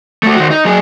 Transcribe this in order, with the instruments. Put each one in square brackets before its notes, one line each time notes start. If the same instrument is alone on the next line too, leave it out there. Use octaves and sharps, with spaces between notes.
[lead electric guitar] A3 F#4
D#3 F#4
D#4
F#3 G#4